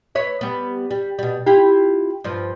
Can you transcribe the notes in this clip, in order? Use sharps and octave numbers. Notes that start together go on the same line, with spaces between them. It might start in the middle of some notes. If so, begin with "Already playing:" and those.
B4 C#5 E5
G3 B3
G3
B2 G3
E4 F4 G4
G2 F3